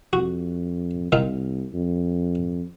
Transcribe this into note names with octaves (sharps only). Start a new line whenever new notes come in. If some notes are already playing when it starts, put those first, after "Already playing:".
F2 F#4
C2 D#3 D#4 F4
F2